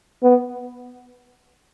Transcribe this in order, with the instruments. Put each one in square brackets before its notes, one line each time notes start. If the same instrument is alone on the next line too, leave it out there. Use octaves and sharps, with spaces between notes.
[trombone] B3